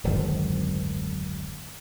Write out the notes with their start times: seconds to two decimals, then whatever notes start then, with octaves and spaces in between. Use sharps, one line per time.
0.04 D1 G#1 F#2 D#3